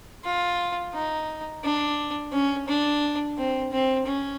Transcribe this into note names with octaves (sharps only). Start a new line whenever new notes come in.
F4
D#4
D4
C#4
D4
C4
C4
C#4